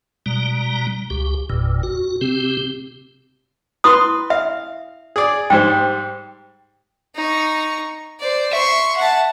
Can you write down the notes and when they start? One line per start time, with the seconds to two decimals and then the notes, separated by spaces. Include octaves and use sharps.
0.26 B2 G3 A#5
1.10 C#2 G4
1.50 G1 E2 A#2
1.83 F#4
2.21 C3 C4 G4
3.84 E4 B4 C6 D#6
4.30 E5 F5
5.16 G#4 D5
5.50 G#2 G3 C5 G5
7.15 D#4 C#6
8.20 C5 D5
8.53 E5 C6 C#6
8.97 F#5 A5